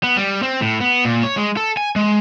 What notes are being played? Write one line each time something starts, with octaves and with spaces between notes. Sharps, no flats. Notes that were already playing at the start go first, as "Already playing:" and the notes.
B3
G3
C4
A2
B3
A#2
C#5
G#3
A4
G#5
G#3